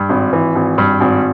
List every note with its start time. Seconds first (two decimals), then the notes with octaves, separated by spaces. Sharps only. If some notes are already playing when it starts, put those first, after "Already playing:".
Already playing: G2
0.09 G#1
0.33 E3
0.55 G#1
0.78 G2
1.01 G#1